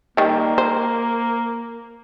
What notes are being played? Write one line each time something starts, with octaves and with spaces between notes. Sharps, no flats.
D#3 G3 A#3
C5